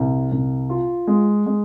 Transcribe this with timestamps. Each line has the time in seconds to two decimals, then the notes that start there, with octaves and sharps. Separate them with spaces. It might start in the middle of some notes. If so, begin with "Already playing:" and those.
Already playing: C2
0.32 C2
0.70 F4
1.07 G#3
1.46 G#3